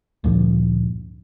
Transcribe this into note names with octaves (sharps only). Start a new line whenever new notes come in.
D2 G2 A#2 F3